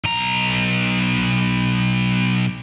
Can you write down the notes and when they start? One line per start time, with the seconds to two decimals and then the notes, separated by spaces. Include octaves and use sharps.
0.04 B1 A#5